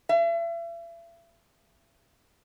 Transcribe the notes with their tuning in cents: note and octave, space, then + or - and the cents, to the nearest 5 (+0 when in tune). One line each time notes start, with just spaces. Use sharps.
E5 +40